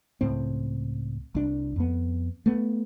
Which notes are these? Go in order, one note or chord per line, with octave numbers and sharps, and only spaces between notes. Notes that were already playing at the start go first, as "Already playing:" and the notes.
C#2 A2 C4
C2 D4
F2 B3
A3 B3